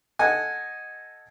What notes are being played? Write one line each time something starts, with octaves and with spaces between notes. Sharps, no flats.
A4 D#5 F#5 G#5